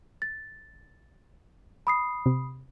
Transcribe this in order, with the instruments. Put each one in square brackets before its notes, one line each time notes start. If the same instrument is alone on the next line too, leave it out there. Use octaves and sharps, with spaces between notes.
[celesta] A6
B5 D#6 C7
[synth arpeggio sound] C3